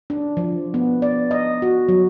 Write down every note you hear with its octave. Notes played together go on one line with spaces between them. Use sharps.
D4
F3
B3
D5
D#5
F#4
F#3